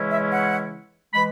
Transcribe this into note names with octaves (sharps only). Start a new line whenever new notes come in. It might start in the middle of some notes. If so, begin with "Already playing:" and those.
Already playing: C#3 E3 G#3 C#4 E4
E5
F#5
E3 G#3 B5